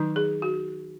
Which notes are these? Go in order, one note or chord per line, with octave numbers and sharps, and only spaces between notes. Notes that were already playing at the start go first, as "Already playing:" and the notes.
Already playing: D#3 F#3 D#4
G#4
F#4